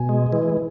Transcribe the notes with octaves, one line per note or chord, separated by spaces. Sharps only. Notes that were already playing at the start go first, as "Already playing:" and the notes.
Already playing: B2 G#5
G#3
E3